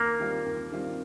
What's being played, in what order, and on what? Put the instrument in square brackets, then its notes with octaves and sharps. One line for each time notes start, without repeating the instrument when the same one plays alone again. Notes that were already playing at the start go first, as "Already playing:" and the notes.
Already playing: [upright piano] D#2 [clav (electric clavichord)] A#3
[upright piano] D#3 G3 C4 F4
D#2
D#3 G3 C4 F4